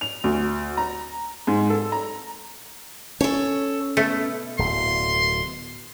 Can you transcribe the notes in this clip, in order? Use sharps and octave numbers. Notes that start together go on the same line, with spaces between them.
F7
D2
A#5
G#2
A4
A#5
C#4 A4 C#5
B2 A3
D1 C6